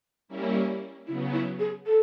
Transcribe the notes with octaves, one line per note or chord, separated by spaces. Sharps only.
G3 A#3 C#4 E4
C#3 F#3 B3 E4
E4
G#4
A4